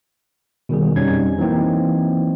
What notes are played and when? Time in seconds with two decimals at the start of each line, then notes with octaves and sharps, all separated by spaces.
0.69 B2 D#3 G3 G#4
0.96 F2 G3 C4 C#4 D#4 G#6
1.38 E3 F#3 A#3 C4 D#4